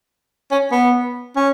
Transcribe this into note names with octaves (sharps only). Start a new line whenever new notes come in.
C#4
B3
C#4